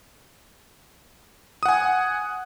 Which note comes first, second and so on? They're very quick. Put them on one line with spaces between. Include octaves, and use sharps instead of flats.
D#6 F#5 G#5